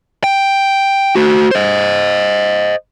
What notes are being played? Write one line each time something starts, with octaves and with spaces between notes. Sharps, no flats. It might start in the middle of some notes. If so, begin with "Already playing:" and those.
G5
A3 F#4
C5 D#5